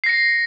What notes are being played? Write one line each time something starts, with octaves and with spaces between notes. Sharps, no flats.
A#6 C7 C#7